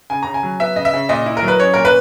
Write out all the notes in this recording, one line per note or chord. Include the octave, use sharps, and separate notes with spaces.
C#3 G#5
C#3 A#5
G#5
F#3
B3 E5
C#3 D#5
E5
C#3
A#2 D#5
E4
A#4
F#3
B4
C#4 C#5
A#2 A#4
B4